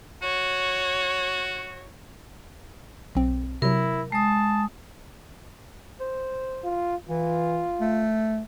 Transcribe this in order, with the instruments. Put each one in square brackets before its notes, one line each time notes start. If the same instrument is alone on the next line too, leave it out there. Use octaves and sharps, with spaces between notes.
[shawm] F#4 [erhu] C#5
[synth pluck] B1 C4
[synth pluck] C3 F#3 [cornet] E4 [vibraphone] A#4
[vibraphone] G#3 D#6 [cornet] A5
[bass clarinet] C5
[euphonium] F4
[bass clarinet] E3 [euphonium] F4
[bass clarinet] A3